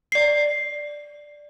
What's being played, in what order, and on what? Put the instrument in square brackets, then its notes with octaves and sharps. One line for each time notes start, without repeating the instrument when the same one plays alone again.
[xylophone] D5 C7